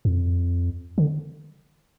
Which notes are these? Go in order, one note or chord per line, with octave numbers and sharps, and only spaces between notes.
F2
D3